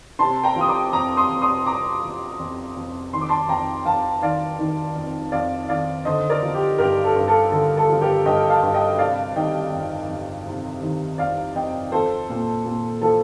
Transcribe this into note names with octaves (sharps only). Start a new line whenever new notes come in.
C3 A5 C6
G5 A#5
F3
D#6
A#5 D6
F2 A#5 D6
C6 D#6
F2
C6 D#6
C3 A#5 D6
F3
F2
F2
D#3 C6
D6
A5 C6
F2 G5 A#5
F2 F5 A5
D#3 D5 F5
D#3
F2
F2 D5 F5
D#3 D5 F5
D3 C5 D#5
A#4 D5
F3
G4
G2 G4 A#4
A4
G2
A4
D3 A4
A4
F3
G4 A#4
G2 D#5 G5
F5 A5
G2
D#5 G5
C3 D5 F5
D#3 D#5 G5
F2
F2
C3
D#3
F2 D5 F5
F2 D#5 G5
F3 A4 C5
A#2
A#2
F3 A4